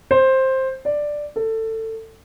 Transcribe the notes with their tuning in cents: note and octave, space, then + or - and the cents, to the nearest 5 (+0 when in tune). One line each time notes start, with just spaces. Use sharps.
C5 +10
D5 +5
A4 +20